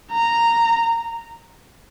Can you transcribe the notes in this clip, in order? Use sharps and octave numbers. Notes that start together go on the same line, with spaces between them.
A#5